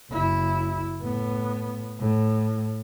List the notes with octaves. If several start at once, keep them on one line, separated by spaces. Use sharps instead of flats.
F#1 E4
A2 B3
A2